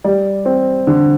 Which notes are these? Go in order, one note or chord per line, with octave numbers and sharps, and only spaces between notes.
G3 D5
C4
D3